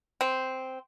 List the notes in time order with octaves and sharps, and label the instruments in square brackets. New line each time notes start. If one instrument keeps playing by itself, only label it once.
[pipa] C4